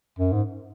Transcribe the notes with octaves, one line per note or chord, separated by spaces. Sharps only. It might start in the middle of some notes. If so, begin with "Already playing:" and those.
F#2
G#2